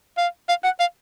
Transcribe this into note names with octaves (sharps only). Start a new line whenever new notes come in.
F5
F5
F#5
F5